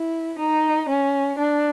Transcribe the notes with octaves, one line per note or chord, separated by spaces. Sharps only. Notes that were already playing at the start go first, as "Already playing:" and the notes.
Already playing: E4
D#4
C#4
D4